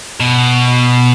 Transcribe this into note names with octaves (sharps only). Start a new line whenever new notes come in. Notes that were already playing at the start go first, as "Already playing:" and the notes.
B2